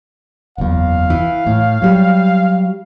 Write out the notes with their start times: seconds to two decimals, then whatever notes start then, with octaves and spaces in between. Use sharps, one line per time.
0.58 F#1 E2 F5
1.10 E3
1.47 A2
1.82 F#3 G3